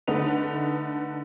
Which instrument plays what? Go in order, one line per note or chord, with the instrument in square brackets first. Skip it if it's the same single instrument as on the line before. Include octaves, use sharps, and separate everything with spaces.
[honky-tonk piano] D3 A3 D#4 B4 F#5 F7